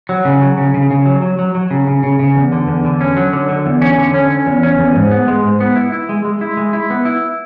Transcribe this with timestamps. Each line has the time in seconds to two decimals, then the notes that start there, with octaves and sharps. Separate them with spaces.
0.09 F#3
0.25 C#3
0.42 F#3
0.57 C#3
0.74 C#3
0.90 C#3
1.06 F#3
1.22 F#3
1.39 F#3
1.55 F#3
1.71 C#3
1.87 C#3
2.03 C#3
2.19 C#3
2.36 E2
2.52 D3
2.68 E2
2.85 D3
3.01 C#4
3.17 F#3
3.33 D3
3.49 D3
3.66 E2
3.82 C#4
3.98 D3
4.14 C#4
4.30 C#4
4.46 E2
4.63 C#4
4.79 E2
4.95 G#2
5.11 B3
5.28 G#3
5.44 G#2
5.61 B3
5.76 E4
5.92 E4
6.09 G#3
6.25 G#3
6.41 E4
6.57 G#3
6.73 E4
6.90 B3
7.05 E4